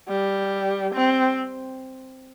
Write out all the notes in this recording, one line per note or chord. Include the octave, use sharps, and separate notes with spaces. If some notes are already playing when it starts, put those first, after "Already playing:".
G3
C4